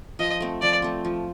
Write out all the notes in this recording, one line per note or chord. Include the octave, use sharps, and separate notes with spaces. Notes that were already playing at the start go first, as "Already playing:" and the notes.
F3 D#5
A3 C4
F3 D5
A3 C4
F3